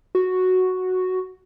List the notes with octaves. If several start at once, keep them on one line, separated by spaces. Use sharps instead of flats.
F#4